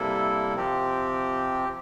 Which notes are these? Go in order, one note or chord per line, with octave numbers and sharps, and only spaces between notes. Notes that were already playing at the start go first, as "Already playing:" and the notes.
Already playing: C3 G3 A#3 E4 A4
C3 F3 C4 G4